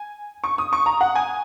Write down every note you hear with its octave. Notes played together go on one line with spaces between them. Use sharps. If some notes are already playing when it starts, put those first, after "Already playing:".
Already playing: G#5
C#6
D#6
C#6
A#5
F#5
G#5